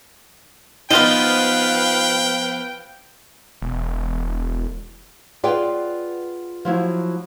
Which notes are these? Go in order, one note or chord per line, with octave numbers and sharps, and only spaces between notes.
F3 B3 D#4 F4 B4 F5 G5
E1
F4 G#4 B4 D5 F#5 G5
F3 F#3 E4